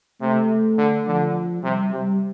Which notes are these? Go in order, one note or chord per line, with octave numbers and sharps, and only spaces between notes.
C3 A3
D3
D3 F3
C3 G3
C3 G3